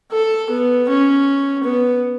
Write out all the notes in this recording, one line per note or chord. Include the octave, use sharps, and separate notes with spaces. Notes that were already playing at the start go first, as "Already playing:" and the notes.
A4
B3
C#4
B3